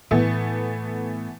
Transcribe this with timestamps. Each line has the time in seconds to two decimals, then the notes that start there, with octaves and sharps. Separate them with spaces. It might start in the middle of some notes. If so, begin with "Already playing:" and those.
0.11 A2 E3 A3 B3